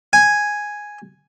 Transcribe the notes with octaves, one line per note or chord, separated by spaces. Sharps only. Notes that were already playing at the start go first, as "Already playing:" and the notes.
G#5